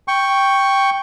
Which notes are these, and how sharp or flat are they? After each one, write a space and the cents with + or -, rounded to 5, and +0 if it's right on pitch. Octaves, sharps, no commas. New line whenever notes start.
G5 +0 C#6 +0